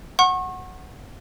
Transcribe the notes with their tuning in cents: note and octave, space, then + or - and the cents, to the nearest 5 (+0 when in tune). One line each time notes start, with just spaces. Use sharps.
F#5 +0 C#6 -35